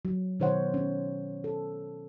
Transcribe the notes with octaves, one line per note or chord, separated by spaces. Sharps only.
F#3
B2 D#3 C5 C#5 F#5
C#4
A4